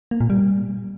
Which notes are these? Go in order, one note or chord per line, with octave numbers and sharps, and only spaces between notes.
A#3
A#2
G3